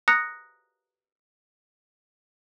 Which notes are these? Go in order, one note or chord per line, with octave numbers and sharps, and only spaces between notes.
A#5 D#6 F#6 A#6 C#7